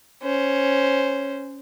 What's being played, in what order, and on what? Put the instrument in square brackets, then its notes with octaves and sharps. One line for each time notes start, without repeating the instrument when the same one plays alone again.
[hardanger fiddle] C#4 C5